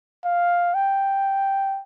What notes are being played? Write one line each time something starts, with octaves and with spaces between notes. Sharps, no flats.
F5
G5